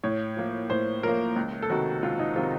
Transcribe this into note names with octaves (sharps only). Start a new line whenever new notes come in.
A2 C#5
F3 A#3
A2 C5
F3 A#3 A#4
C#2
A4
C3 D#3 F#4
C#2 F4
D#4
C3 D#3 F4